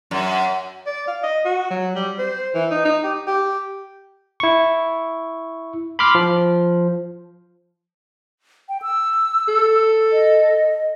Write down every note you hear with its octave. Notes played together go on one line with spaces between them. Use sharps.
F#2
D5
F5
D#5
F#4
F#3
G3
C5
E3
D#4
D#4
G4
G4
E4 C#6
B5 C6 D6 F6 B6
F3
G5
E6
A4
D#5